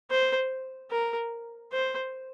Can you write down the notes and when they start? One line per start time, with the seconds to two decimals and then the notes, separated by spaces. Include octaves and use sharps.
0.10 C5
0.91 A#4
1.72 C5